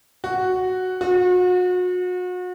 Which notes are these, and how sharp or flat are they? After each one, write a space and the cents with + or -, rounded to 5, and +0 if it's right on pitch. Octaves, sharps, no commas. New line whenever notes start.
F#4 +0
F#4 -35